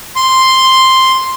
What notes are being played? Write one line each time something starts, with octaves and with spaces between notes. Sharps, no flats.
C6